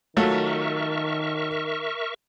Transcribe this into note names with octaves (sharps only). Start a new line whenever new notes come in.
D#3 F#3 A3 F4 A#4 E5 C#6